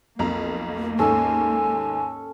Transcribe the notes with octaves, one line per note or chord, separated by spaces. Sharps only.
B1 F2 A#3 A#5
D#2 G#2 C#4 A4 G#5